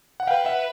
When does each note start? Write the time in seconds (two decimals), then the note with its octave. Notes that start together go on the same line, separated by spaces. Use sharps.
0.20 F#5
0.27 B4 F5 G5
0.45 E5 F#5